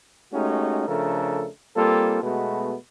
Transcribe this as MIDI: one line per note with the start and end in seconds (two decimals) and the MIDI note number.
0.33 0.87 56
0.33 0.87 57
0.33 0.87 61
0.33 0.87 63
0.33 0.87 66
0.33 0.87 67
0.88 1.48 49
0.88 1.48 53
0.88 1.48 57
0.88 1.48 62
0.88 1.48 69
0.88 1.48 70
1.76 2.22 55
1.76 2.22 58
1.76 2.22 60
1.76 2.22 65
1.76 2.22 69
2.23 2.76 47
2.23 2.76 56
2.23 2.76 57
2.23 2.76 59
2.23 2.76 66
2.23 2.76 71